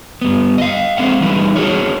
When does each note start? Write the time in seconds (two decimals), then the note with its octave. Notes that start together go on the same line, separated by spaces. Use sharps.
0.22 G2 B3
0.58 D#5 F5
0.97 G#3 A3 C4 F5 F#5
1.21 E3 G3 D4 D#4 B4
1.56 D4 F#4 G#4 A#4 C#5